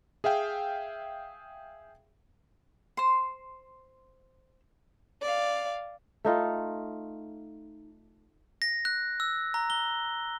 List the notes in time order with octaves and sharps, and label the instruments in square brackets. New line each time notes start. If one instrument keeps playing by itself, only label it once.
[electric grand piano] G#4 E5 F5 G5
[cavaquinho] C5 C6
[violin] D5 F5
[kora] A3 D#4 F4
[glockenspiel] A#6
F#6
E6
A#5
G7